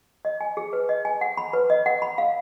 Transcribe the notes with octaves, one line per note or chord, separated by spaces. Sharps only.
D#5
G#5
G#4
B4
D#5
G#5
F#5
B5
B4
D#5
F#5
B5
F5